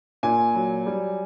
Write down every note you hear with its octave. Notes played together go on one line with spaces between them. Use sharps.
A#2 G#5
F#3
G3